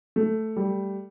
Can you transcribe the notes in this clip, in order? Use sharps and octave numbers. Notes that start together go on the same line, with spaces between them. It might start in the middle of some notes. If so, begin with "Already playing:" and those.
A3
G3